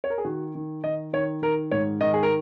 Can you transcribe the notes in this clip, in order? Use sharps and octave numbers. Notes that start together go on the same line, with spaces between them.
C#5
A#4
G#4
D#3 F#4
D#3
D#3 D#5
D#3 C#5
D#3 A#4
G#2 C#5
D#3 D#5
G#4
A#4